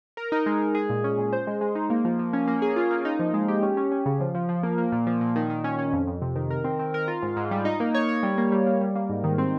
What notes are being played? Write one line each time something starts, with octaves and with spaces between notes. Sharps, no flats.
A#4
D#4
G#3
G#3
G#4
A#2
C#4
A#2
C5
G#3
G#3
D#4
A#3
F3
F3
C#4
A#3
G#4
F4
A#3
D#4
F3
G#3
G4
C#4
C#4
C#4
C#3
F3
F3
F3
A#3
A#3
A#2
F3
A#2
D#3
D#3
C#4
C#4
F2
F2
C3
D#3
A#4
C4
C4
A#4
F4
G#2
G#2
G3
D#4
A#3
C#5
C#5
G3
A#3
G3
A#3
G3
A#3
G#2
D#3
C4